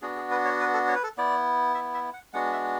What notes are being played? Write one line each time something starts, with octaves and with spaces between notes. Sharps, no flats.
B3 D4 F#4 G#4
G#4
B4
C#5
B4
A4
C#5
B4
A4
B3 E4 D5
E5
E5
F#5
G#3 B3 D4 F#4 F#5
E5